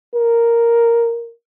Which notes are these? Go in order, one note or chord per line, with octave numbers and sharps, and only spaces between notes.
A#4